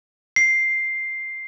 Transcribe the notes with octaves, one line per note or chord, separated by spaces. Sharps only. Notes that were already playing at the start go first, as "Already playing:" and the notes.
C7